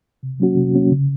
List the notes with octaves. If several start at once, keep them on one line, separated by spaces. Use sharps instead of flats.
C3
F#3 A#3 C#4 F#4
C3
F#3 A#3 C#4 F#4
C#3